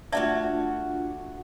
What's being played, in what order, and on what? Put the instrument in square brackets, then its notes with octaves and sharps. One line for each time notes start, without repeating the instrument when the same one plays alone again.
[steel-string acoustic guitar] A3 F#4 F#5 [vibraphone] D4 F4 [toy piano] D5 E5 A5